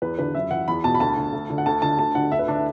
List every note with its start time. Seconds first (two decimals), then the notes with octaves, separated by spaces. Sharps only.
0.02 E2 B4
0.19 D3 B4
0.35 F#2 E5
0.51 E3 F#5
0.68 E2 B5
0.84 B2 A5
0.95 B5
1.00 D2 A5
1.17 D3
1.33 D2
1.50 D3
1.58 F#5
1.66 D2 A5
1.82 D3 A5
1.99 D2 A5
2.15 D3 F#5
2.32 D2 E5
2.39 B4
2.48 D3 D4
2.56 E4